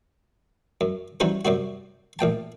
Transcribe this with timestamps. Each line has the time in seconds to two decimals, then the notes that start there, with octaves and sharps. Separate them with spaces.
0.81 F#2
1.20 E3 F#3 G3 C#4 D#4 C5
1.45 F#2 C3 G3 F#4
2.19 A1 A#2 G5 A5